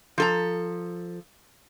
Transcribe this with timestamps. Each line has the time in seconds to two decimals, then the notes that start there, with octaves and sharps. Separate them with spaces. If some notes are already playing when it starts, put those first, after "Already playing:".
0.18 F3 A4 A#5